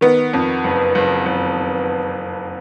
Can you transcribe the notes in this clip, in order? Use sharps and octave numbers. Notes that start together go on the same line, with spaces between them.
D#3 B3
F2
F#1
F#1
F#1